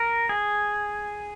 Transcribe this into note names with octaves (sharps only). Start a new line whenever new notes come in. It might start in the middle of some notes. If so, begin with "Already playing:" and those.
Already playing: A#4
G#4